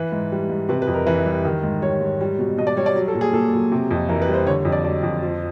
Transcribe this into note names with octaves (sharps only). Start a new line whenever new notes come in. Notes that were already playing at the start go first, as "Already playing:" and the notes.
Already playing: E3 B4
G#2
G3
G#2
C3 B4
B4
F2
A#4
E3 B4
G3
D#3
G#2
G3 C#5
G#2
G3
B2
B2 D#5
D5
G3 C#5
D5
F#3
A4
A#2
G#4
A#2 A4
F#3
C3
F2
E3 A#4
B4
G3
C5
D3 C#5
F2
D5
F#3 D5
F2
F3